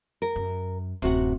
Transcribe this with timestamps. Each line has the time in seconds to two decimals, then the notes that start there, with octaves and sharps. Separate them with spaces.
0.22 A#4
0.36 F#2
1.02 D1 F#2 C3 F#4 F#5